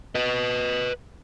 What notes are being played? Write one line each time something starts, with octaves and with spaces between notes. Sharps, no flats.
B4 D#5